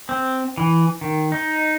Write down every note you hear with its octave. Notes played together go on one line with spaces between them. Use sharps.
C4
E3
D#3
D#4